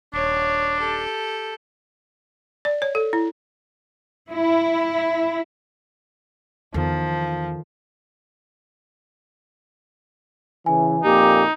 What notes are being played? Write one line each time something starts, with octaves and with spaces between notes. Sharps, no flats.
D#1 D4 C#5
G4 A4
D5
C#5
A4
E4
E4
E2 D#3 F3 A4
C#3 E3 G#5
F2 A#2 A#3 D#4 G4